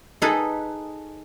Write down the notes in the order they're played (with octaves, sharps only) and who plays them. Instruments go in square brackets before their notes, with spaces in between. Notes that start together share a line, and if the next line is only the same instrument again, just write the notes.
[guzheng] D#4 G#4 A4 B4